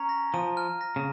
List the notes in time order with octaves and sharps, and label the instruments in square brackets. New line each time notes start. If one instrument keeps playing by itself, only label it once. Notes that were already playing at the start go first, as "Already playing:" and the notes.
Already playing: [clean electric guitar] C#4 [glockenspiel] A#5
[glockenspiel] A#6
[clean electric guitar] F3 [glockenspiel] D#7
[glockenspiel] F6
A#6
[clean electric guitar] C#3